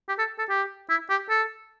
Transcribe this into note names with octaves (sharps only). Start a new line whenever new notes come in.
G4
A4
A4
G4
E4
G4
A4